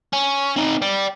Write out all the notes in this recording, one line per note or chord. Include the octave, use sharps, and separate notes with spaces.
C#4
C4 D#4
D5 G5